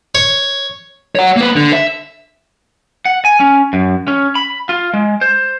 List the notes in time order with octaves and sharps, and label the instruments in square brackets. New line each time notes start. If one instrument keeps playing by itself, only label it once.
[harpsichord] C#5
[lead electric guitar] C#5 F#5
A#3 B4
D3
E5
F#5
G#5
C#4
F#2
C#4
B5
F4
G#3
C5